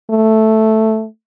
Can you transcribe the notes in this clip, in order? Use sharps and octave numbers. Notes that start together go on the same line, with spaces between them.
A3